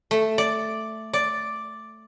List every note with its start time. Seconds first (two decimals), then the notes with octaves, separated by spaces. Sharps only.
0.11 A3
0.38 D5
1.13 D5